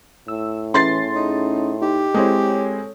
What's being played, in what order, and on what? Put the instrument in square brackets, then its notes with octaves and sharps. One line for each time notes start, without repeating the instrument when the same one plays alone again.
[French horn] A2 [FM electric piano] E6
[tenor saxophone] E3 [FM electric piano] C#4 G#4 [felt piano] C6 A6 C7
[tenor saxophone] D#4
[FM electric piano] D#4 [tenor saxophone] G4
[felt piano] G#3 C4 E4 [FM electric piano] A4 C#5